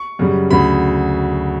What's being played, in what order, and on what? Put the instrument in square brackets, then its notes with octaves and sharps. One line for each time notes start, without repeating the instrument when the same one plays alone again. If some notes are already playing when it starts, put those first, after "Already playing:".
Already playing: [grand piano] C#6
F#2 C#3 G3
D2 C#3 F#3 B5